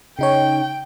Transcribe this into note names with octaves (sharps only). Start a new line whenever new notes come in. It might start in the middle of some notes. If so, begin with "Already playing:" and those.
C#3 D#4 C#5 G5